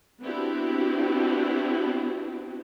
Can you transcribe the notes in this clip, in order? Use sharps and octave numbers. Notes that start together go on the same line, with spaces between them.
B3 C4 D4 E4 F#4 G4